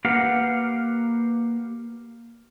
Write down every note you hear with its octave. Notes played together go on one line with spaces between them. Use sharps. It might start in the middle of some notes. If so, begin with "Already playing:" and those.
A#3 G4 B4 F5 F#5